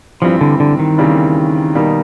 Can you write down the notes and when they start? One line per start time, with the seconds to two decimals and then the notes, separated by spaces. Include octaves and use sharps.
0.22 G2 E3 F3 G3 C4
0.41 D3
0.60 D3
0.79 D#3
0.98 D#2 C#3 E3 G3 C4
1.75 B2 G3 A#3 D#4